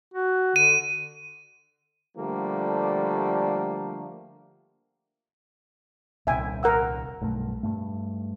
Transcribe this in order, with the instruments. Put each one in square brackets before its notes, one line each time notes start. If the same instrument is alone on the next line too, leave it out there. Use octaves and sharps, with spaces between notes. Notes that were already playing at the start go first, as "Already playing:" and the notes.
[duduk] F#4
[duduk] D3 [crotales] D#7
[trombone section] D3 F3 G3 A3 A#3
[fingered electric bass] D#1 C2 C3 [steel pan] E5 G5 G#5
[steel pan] A#4 F#5 E6
[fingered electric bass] B1 G2 A3
G2 A3